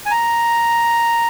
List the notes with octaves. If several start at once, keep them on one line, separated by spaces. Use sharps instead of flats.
G#5
A#5